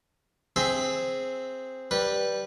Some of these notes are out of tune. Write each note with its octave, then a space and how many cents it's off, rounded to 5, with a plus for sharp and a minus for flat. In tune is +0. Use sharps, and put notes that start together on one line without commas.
C4 +0 G#4 +0 E5 +0
G3 +0 B4 -15